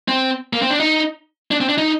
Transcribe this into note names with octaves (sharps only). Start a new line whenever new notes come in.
C4
A#3
C4
D4
D#4
D4
C4
D4
D#4